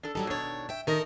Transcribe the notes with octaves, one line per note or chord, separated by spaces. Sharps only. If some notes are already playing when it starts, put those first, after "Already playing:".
D4 A4
F#3 G3 D#4 A4
B2 D#3 D4 C#5
E5 G5
D#3 A4 A#4 D#5